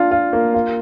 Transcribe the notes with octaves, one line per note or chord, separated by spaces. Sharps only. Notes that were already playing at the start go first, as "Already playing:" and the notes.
Already playing: D4 F4
F4
A#3
F4